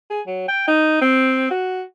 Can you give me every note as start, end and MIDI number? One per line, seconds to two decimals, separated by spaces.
0.10 0.20 68
0.27 0.45 54
0.48 0.67 79
0.68 0.99 63
1.01 1.47 60
1.51 1.83 66